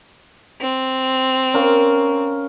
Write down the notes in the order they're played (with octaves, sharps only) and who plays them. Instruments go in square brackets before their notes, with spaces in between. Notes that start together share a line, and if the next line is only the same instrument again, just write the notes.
[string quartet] C4
[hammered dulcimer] C#4 A#4 F5